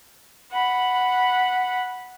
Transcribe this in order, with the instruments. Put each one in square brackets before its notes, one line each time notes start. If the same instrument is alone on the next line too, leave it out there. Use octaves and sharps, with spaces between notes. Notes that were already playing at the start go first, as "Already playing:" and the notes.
[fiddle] F#5 B5